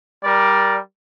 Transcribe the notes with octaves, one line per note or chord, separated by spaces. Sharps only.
G3 A#4 D5